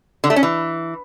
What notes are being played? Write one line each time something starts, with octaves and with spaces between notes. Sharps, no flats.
D3
A3
C#4
E3